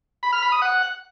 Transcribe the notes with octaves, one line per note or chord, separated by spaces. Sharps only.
B5
F6
B5
D#6
F#5